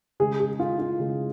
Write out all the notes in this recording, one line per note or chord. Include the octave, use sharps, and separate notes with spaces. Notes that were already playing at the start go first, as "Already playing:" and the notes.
C#3 G#3 G#4
G#4
F4
F4
C#3 G#3